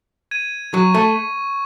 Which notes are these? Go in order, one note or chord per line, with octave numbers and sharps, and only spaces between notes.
G#6 D#7
F#3 C#6
A3